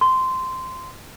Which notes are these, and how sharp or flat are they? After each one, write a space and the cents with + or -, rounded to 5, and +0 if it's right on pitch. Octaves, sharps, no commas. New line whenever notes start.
C6 -15